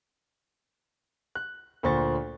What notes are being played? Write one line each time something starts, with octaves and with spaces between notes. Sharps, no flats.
F#6
D2 A#2 C5 C#6 A6